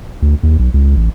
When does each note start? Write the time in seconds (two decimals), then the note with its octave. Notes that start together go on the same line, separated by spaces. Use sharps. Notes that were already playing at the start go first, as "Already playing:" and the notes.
0.22 D2
0.43 D#2
0.59 B1
0.74 C#2
0.97 A1